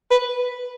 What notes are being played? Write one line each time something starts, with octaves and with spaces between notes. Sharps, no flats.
B4